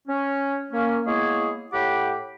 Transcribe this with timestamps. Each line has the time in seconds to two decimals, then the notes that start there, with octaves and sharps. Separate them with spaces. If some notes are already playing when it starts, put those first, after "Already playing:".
0.08 C#4
0.71 A#3 C#4
1.07 G#3 A#3 B3 E4 G#4 C#5
1.73 A2 G4 F#5 G5 B5 D6